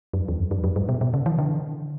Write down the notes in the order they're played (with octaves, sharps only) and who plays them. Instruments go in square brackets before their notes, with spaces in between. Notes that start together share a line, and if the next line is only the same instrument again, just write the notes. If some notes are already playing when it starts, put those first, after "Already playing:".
[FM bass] F#2
E2
F#2
F#2
F#2
G2
B2
B2
C#3
E3
D3